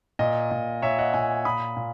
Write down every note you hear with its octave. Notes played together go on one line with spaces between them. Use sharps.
A#2 D#5
A#2
A#2 C#5 E5
D#5 F#5
A#2 E5 G#5
A#2 B5 D#6
A#2